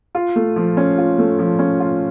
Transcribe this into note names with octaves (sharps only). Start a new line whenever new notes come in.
F4
A3
F3
C#4
F4
A3
F3
C#4
F4